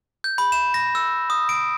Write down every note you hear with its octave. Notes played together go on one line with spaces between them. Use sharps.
G6
B5
E7
A#6
E6
D#6
D7